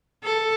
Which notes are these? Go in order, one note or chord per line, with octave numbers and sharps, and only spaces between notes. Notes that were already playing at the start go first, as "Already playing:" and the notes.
A4